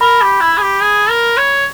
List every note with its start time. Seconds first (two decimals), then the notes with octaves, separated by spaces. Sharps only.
0.01 A#4 B5
0.22 G4
0.41 E4
0.57 G#4
0.62 G4
0.82 G#4
1.10 A#4
1.37 C#5